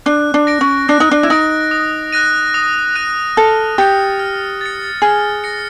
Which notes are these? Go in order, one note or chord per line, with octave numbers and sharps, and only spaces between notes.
D4 F#6
D4
A#6 D7
C#4
D4 F#6
D#4
D4
E4
D#4 A#6 D7
D#6
F#6 A#6 D#7
D#6
F#6 A#6 D#7
A4 F6
G4 A6 C#7
F6
A6 C#7
G#4 F6
A#6 C#7